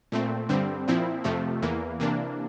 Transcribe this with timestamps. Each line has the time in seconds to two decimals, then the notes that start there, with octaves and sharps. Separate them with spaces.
0.12 A#2 A3 C4
0.49 G2 D3 G3 C4
0.88 A#2 F3 C4 E4
1.24 F2 C3 F3 A3
1.62 E2 E3 A#3
2.00 C3 E3 A#3 D4